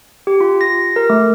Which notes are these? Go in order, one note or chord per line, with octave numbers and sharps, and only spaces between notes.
G4
F4
A#6
A#4
A3